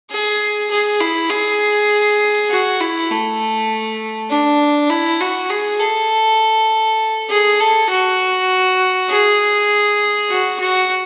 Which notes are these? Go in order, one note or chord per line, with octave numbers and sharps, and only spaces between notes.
G#4
G#4
E4
G#4
F#4
E4
A3
D4
E4
F#4
G#4
A4
G#4
A4
F#4
G#4
F#4
F#4